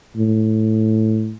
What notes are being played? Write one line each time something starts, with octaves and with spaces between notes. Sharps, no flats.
A2